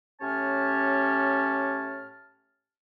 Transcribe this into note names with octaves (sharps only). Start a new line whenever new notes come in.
A2 C#4 G4 C#5 A5 F6